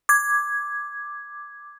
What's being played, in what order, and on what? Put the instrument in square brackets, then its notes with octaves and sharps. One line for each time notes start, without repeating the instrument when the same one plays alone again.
[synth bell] D6 G#6